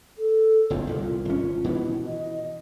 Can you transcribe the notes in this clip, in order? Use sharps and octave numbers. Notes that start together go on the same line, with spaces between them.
A4
F#1 B1 E2 F4
C2 A#2
G#1 C#4
B2 E3 B3 E4
D#5